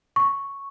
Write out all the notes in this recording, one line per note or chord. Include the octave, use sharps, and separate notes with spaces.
C#6